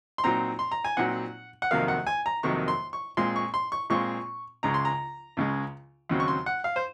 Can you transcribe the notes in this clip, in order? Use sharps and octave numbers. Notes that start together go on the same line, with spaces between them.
C6
A#2 F#3 C4 D#4 A#5
C6
A#5
G#5
A#2 F#3 C4 D#4 F#5
F#5
F2 C3 D#3 F#3 A#3 F5
F#5
G#5
A#5
F2 C3 D#3 F#3 A#3 C#6
C6
C#6
A#2 G#3 C4 F4 C6
C#6
C6
C#6
A#2 G#3 C4 F4 C#6
C#2 C#3 G#3 A#5
C6
A#5
C#2 C#3 G#3
D#2 C#3 F#3 C4
C#6
C6
F#5
F5
C5